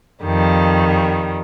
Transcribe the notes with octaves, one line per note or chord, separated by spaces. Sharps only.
F2 D#3 G3